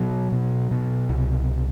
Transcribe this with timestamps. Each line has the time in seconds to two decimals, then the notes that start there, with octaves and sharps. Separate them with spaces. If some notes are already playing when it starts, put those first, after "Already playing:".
Already playing: B2 F#3
0.32 B2
0.71 B2
1.09 C2